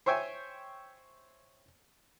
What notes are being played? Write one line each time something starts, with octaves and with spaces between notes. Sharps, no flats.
C5 C#5 E5 G5 G#5